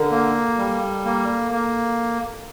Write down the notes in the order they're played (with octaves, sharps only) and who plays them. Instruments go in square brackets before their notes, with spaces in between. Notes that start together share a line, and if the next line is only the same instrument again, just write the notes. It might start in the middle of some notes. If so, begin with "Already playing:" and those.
Already playing: [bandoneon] D3 [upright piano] A4 A#4
[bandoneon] A#3
G3
A#3
A#3